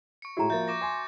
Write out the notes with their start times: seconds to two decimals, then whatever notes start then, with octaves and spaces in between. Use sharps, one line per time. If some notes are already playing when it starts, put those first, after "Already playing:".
0.22 C#6 C#7
0.37 A2 G#3 E4 F#4 A#5
0.50 F3 A#3 E5 G6 A6
0.68 C#6 D6 A#6
0.81 G#5 C6